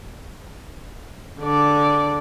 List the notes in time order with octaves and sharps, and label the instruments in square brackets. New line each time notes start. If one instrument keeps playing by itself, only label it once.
[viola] D3 D5